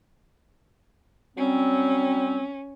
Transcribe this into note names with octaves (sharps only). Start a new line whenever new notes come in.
F#3 G3 C4 C#4